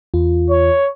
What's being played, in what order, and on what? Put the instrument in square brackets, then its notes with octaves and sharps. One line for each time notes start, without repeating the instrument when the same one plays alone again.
[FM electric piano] E2 F4
[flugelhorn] C#5